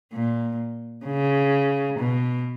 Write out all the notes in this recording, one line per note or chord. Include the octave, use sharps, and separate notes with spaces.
A#2
C#3
B2